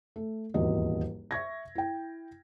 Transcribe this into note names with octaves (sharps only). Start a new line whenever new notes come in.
A3
D#1 G#1 E2 F#4 D#5
E5 C#6 G#6 A#6
E4 G5